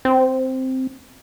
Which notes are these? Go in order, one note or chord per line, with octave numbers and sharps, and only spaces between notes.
C4